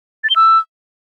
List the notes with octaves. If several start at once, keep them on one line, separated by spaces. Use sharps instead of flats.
A6
G7
E6